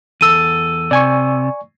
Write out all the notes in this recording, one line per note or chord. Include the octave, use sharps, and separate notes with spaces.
E2 A4 E6 D#7
C3 D5 G#5 C#6